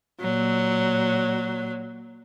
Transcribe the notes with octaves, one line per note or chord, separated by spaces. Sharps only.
A#2 F#3